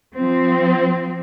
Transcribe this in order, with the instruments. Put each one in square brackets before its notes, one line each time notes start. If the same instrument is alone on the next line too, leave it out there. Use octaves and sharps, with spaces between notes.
[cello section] F3 C4